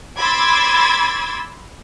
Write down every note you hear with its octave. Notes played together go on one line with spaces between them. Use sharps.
B5 C6 D6 E6 G#6 A6